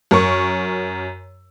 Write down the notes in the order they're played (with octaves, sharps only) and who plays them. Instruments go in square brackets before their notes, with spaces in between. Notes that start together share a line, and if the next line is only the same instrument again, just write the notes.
[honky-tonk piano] F#2 A#4 C#6